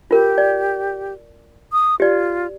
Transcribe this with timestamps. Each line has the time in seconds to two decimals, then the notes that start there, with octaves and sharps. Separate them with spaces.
0.11 F4 G4 A#4
0.38 D5
1.72 D#6
2.00 F4 G4 D5